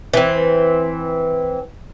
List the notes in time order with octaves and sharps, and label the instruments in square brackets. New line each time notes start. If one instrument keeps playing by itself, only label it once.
[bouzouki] E3 C4